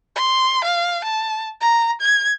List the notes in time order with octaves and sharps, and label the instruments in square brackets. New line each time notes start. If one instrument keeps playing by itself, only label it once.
[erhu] C6
F5
A5
A#5
G#6